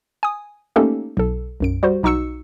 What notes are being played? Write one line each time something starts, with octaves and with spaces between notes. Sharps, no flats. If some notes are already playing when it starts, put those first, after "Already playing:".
G#5 D#6
A3 A#3 C#4 D#4 G4 A4
B1 A4
B1 F#2 D7
G3 F#4 C5
B1 D#4 F#4 C#6 E6 C#7